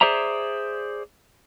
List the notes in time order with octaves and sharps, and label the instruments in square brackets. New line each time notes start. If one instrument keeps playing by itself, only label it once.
[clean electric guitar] G#4 C5 D5 E5 A#5